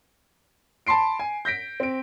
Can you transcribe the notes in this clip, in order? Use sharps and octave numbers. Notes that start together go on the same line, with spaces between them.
A5 B5 C6 C7 D7
G#5
G6 A#6 B6 D7
C4 D7